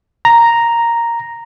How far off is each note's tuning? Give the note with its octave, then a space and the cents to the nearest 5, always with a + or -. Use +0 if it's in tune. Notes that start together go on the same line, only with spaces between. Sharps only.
A#5 +0